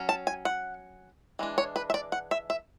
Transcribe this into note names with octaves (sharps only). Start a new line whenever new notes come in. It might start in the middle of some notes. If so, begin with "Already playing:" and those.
Already playing: F#3 C#4
A5
G#5
F#5
E3 G#3 D4
C#5
B4
E5
D5
F#5
E5
E5